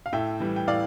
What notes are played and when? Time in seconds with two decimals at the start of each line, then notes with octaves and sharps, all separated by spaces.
0.06 F5
0.13 A2 E5 G5
0.40 E3 G3
0.56 G5
0.67 A2 D5 F5